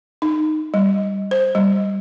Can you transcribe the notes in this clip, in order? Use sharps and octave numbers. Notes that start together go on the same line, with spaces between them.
D#4
G3
C5
G3